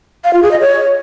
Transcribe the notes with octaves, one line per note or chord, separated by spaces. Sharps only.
F5
F4
G#4
D#5
C#5